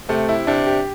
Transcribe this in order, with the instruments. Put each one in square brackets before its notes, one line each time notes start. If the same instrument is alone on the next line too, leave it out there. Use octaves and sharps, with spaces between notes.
[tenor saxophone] C3 [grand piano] A3
[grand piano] E4
[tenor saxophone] C3 [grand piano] D4
[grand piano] G4